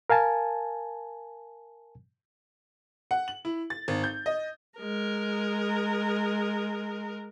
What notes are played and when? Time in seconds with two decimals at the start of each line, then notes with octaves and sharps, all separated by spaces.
0.10 A#4 F5 G#5 A5
3.11 F#5
3.28 F#7
3.45 E4
3.70 A6
3.88 G#1
4.04 G6
4.26 D#5
4.79 G#3 A#4